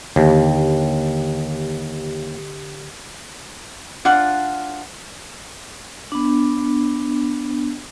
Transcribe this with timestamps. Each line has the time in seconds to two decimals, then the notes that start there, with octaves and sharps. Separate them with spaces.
0.16 D#2 D3 G4
4.05 D4 F4 F#5
6.12 B3 D4